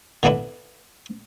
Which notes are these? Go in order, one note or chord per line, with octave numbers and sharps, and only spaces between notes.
D3 E3 B3 D4 E4